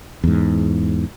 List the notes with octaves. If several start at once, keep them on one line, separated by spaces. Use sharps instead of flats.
E2 G#2